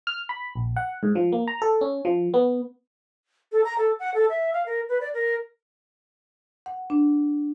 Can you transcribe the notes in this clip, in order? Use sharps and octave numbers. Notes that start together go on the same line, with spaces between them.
F6
B5
A#1
F#5
G#2
F3
A#3
A#5
A4
C#4
F3
B3
A4
A#5
A4
F#5
A4
E5
F5
A#4
B4
D5
A#4
F#5
D4